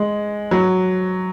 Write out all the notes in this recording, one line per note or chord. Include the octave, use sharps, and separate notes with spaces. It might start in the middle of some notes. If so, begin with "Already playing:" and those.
Already playing: G#3
F#3